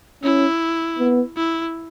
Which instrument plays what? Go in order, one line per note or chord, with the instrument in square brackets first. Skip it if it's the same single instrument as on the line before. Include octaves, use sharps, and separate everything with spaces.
[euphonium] C#4 [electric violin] E4
[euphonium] B3
[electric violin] E4